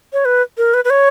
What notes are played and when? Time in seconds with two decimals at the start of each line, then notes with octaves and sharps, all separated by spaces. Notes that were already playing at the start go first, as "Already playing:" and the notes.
0.13 C#5
0.25 B4
0.58 A#4
0.74 B4
0.85 B4
0.90 C#5